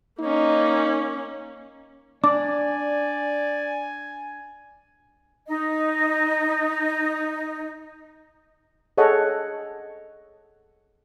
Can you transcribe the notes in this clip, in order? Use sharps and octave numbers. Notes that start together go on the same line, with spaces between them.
A#3 C#4 D#4
D4 D5 G#5 D6
D#4 D#5
G#4 A4 C#5 D#5 F#5